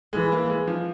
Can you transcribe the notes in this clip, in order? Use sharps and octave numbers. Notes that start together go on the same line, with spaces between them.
E3 G#3
A#3
G#3
F3